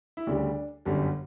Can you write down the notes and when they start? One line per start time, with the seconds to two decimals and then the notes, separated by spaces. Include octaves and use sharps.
0.17 E4
0.27 D2 C#3 G3 D4
0.85 G1 F#2 D3 G3